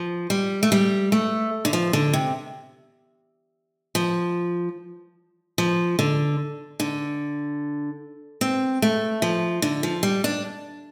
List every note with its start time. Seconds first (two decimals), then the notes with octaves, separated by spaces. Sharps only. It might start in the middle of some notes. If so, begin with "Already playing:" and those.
Already playing: F3
0.30 G3
0.63 A3
0.72 G3
1.12 A3
1.65 D3
1.73 F3
1.93 D3
2.13 C3
3.95 F3
5.58 F3
5.99 D3
6.80 D3
8.41 C4
8.82 A3
9.22 F3
9.62 D3
9.83 F3
10.03 G3
10.24 D4